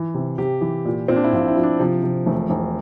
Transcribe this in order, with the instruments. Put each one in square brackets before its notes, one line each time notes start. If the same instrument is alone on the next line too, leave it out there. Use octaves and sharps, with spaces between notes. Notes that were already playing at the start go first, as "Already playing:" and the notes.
Already playing: [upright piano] E3
C3
[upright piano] C3 [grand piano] G4
[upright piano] E3
A#2
[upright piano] A#2 [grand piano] C4
[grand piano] D4
E4
[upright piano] A#1 [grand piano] F4
[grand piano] E4
[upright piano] F3
[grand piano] D4
[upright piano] C3 [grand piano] F3
[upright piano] C3
[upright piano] E1 [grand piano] A3
[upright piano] E1